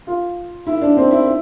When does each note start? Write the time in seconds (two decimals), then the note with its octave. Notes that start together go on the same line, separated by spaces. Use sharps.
0.07 F4
0.67 E4
0.81 D4
0.97 C4
1.11 E4
1.26 E4